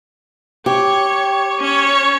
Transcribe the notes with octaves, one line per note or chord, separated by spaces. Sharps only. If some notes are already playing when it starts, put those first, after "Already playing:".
G4 C#5
C#4 C#5